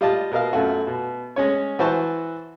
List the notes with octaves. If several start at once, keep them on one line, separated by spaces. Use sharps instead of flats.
G3 F4 D#5 A5
B2 A#4 D#5 F5
F#2 A3 F4 F#4
B2
G#3 C#4 C#5
E3 F#4 C5 A5 C#6